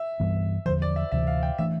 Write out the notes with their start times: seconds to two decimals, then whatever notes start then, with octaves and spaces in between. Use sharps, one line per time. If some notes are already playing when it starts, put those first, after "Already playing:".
Already playing: E5
0.20 G2 E3 G3 B3
0.66 E2 D3 F3 C5
0.82 D5
0.96 E5
1.12 D2 C3 E3 E5
1.27 F5
1.43 G5
1.58 E3 A3 D4 E5